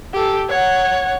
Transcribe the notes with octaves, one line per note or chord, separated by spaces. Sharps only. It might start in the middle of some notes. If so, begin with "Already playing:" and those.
G4 A4
C#5 F#5